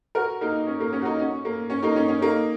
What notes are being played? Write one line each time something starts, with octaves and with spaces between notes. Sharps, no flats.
F#4 A#4
A#3 D#4
C#4
A#3
C#4
F#4
A#3 D#4
C#4
A#3
C#4
A#3 D#4
C#4
C#4
A#3 D#4